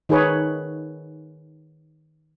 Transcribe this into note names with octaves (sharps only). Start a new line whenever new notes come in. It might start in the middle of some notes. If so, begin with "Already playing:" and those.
D#3 D#4 G#4 B4 C#5